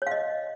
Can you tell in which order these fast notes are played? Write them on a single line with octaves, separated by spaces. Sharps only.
C#5 F5 D#5